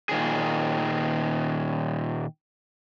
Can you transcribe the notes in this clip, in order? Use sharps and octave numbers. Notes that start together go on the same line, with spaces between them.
A#2 D#3 G#4